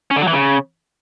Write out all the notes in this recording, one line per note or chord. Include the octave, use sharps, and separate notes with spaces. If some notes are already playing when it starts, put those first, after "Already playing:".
C#4
D3
F#3
E3
C#3